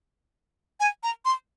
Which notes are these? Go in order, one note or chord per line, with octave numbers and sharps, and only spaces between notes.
G#5
A#5
C6